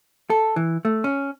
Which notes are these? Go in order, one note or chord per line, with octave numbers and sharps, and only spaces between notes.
A4
E3
A3
C#4